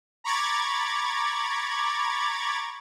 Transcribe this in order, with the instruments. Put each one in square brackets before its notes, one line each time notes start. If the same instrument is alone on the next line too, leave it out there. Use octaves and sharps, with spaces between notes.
[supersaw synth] A#5 B5 C#6 D6 G#6 A6